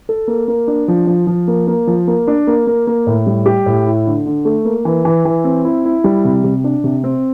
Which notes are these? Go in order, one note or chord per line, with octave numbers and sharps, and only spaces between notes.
A4
A#3
A#3
D4
F3
F3
F3
A#3
A#3
F3
A#3
D4
A#3
A#3
A#3
A2
G3
G4
A2
E4
D3
D3
A3
A#3
E3
E3
E3
C4
E4
E4
G3
C3
C3
D4
C3
C4